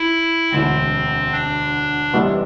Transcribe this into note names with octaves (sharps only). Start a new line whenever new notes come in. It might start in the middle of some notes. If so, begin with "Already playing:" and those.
Already playing: E4
E1 D2 D3 C4
D4
F1 E2 C3 G3 B3